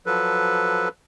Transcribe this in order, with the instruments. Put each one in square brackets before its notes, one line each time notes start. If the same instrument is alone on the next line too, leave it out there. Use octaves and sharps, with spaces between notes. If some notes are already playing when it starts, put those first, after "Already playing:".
[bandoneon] F3 F#3 A4 B4